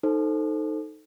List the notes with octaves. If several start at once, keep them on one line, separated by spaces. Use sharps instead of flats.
D#4 A4 C5